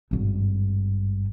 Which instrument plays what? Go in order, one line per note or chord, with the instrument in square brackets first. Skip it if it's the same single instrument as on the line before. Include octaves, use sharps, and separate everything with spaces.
[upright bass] G#1 G2